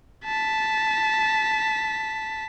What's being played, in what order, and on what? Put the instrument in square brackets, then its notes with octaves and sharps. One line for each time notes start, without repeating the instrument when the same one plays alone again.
[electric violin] A5 B6